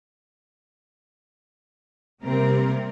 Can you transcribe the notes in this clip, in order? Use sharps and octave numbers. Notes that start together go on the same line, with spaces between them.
C3 G3 A#3 C4 A#4